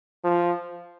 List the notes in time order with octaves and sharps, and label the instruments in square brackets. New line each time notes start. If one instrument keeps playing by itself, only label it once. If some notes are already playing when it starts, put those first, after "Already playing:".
[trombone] F3